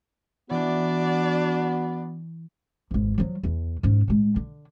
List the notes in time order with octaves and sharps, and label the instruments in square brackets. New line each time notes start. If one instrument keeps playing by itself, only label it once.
[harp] E3 [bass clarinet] B3 [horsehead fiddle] D4 D5 [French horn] F#4
[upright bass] G#1 E2
F3 F#3
E2
G#2 C#4
A2 G#3
D3